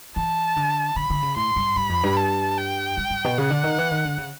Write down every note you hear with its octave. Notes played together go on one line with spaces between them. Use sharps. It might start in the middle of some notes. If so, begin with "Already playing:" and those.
E3 A5
D3
D3 B5
D3
C#3
A2 C6
G2
G2 B5
F2
G2
A5
G5
G2
G2
B2
C#3 F#5
D3
D#3
E3
D#3
D3
C#3